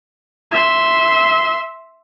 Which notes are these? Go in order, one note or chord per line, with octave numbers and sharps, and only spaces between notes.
E5 C6